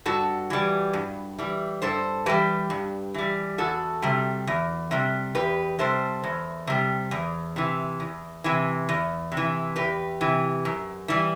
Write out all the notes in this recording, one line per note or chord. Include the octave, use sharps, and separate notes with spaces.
G2 F#4 A4
E3 G3
G2
E3 G3
G2 A4 C5
E3 G3 G4 B4
G2
E3 G3
E2 F#4 A4
C3 G3
E2
C3 G3
E2 G4 B4
C3 G3 A4 C5
E2
C3 G3
E2
C3 E3
E2
C3 E3
E2
C3
E3
E2 G4 B4
C3 E3
F#2
E3 G3